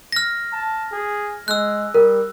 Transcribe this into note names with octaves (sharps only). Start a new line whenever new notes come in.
F6 A#6
A5
G#4
G#3 E6 F#6
G3 A#4